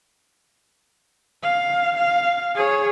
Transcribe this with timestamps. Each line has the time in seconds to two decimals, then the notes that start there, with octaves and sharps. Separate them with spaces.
1.43 F5
1.97 F5
2.55 G#4 C#5